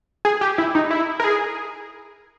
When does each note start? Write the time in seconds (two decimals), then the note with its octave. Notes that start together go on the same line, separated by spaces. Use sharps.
0.25 G#4
0.41 G4
0.58 E4
0.75 D#4
0.91 E4
1.20 A#4
1.24 G#4